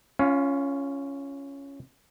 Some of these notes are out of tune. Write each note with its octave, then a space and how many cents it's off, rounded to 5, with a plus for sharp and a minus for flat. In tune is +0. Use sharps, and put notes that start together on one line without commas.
C#4 +0 F4 -25 F5 +25